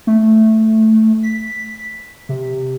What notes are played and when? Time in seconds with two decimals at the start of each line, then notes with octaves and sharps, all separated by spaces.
0.07 A3
1.23 B6
2.29 C3